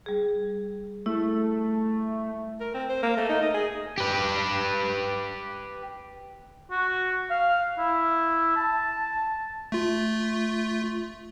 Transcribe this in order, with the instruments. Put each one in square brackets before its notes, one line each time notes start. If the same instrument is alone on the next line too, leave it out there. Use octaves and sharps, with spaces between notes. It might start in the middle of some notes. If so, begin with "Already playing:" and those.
[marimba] G3 G#4
[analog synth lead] A3 [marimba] E4
[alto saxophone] A#4
C4
C5
A#3
A3
D#4
D#5
G#4
[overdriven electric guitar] G4 B4
[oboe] F#4
F5
E4
A5
[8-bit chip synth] A3 F4